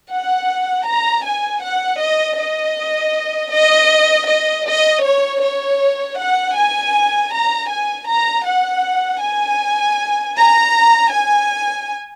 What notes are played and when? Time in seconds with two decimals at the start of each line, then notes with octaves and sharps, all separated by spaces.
0.10 F#5
0.86 A#5
1.24 G#5
1.62 F#5
2.00 D#5
2.38 D#5
3.52 D#5
4.28 D#5
4.66 D#5
5.03 C#5
5.41 C#5
6.18 F#5
6.55 G#5
7.31 A#5
7.69 G#5
8.07 A#5
8.46 F#5
9.22 G#5
10.35 A#5
11.11 G#5